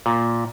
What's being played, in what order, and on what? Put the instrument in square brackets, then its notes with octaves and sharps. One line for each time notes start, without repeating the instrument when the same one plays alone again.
[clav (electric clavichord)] A#2